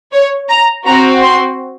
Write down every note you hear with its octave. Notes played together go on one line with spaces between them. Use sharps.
C#5
A#5
C4 F#4 A#5
C6